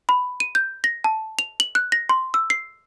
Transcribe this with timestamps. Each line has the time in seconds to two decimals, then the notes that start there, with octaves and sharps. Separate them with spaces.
0.09 B5
0.40 D#7
0.55 G6
0.84 A#6
1.04 A5
1.39 F7
1.60 F#7
1.75 F#6
1.92 A#6
2.09 C6
2.34 E6
2.50 C7